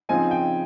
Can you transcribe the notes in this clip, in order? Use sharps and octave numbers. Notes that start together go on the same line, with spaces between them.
C#3 F3 C4 D#4 G#5
G5